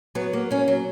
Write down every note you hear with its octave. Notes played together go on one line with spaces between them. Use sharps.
F#3 B3
A#3
F#3 C#4
F#3